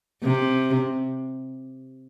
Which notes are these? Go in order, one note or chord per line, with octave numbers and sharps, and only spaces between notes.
C3